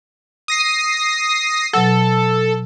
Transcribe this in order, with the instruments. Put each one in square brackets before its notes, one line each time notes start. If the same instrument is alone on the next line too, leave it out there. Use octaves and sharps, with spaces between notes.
[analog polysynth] D#6 A#6 C7
[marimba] B2 F#3 F#5 [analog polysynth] A4